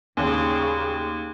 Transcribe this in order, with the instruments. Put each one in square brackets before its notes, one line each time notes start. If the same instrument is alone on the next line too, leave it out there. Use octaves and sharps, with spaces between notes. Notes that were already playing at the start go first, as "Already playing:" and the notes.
[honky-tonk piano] D#2 [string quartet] A2 C#3 D5